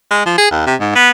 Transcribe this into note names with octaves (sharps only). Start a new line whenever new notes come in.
G#3
F3
G#4
D#2
C3
G#2
B3